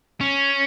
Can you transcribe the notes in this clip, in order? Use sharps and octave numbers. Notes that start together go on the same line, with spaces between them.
C#4